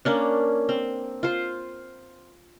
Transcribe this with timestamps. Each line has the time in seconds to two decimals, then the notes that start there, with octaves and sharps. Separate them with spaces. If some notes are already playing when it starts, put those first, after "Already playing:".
0.05 A#3 C#4 D4
0.69 C4
1.23 F4 C5